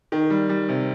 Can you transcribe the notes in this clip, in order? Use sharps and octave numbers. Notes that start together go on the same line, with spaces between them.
D#3
G3
G3
C3